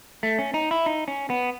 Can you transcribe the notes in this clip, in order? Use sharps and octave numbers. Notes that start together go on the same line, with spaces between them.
A3
C#4
D#4
E4
D#4
C#4
B3